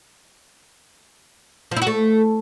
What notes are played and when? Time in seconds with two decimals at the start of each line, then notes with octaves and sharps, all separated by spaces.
1.71 F3
1.77 E4
1.82 F#4
1.87 A3